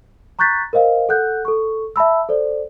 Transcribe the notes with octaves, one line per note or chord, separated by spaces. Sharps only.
A#5 C#6 F#6 G6 A6 B6
A#4 C5 D#5 F5
A4 F#5 F#6 G6
A4 C#6
E5 A5 B5 E6
A4 C5 D5